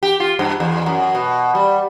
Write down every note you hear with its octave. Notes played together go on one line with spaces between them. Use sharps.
G4
F4
G2
E2
F#2
B2
G3